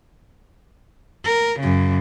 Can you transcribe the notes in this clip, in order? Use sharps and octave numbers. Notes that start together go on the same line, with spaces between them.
A#4
F#2 C#3